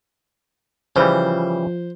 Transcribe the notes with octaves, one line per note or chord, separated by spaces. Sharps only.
C#3 E3 F3 G3 C5